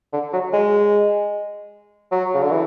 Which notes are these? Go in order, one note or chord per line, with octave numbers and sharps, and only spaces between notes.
D3
F#3
G#3
F#3
C#3
D3
E3